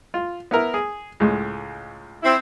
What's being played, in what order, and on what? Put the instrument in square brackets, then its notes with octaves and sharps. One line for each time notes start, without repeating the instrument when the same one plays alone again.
[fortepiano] F4
B3 E4 A#4
G#4
C#2 A2 G#3
[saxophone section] C4 E4